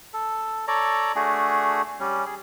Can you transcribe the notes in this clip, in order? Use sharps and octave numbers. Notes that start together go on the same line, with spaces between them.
A4
A4 C#5 D5 A#5
A3 D4 F#4 G#4
G3 C#4
G#4